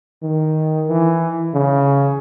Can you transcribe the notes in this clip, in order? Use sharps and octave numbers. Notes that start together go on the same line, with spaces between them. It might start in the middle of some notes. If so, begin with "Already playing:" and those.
D#3
E3
C#3